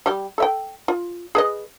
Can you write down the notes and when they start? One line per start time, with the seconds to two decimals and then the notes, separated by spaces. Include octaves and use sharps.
0.06 G3 G4
0.38 A4 E5 G5
0.88 F4
1.35 G#4 B4 D#5